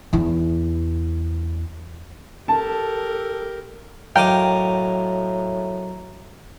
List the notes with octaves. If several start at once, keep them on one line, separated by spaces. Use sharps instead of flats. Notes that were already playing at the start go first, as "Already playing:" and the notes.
E2 E4
G4 A4 A#4 A5
F#2 A2 D#5 F5 G5 A#5 D6